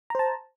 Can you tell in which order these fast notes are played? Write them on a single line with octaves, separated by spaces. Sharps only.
A#5 C5 A5